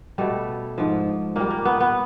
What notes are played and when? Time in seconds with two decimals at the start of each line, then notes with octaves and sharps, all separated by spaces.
0.18 B2 G3 A3
0.78 G#2 F3
1.36 A#2 G3 A#3
1.50 A#3
1.65 B3
1.80 B3